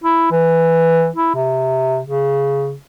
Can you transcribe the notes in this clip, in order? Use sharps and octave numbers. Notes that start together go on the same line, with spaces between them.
E4
E3
E4
C3
C#3